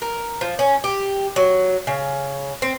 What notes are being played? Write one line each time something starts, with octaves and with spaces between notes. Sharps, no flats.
A#4
F3
C#4
G4
F#3
C#3
C4